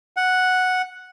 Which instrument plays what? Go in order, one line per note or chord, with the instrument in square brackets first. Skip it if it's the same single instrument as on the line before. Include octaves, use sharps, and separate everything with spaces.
[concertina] F#5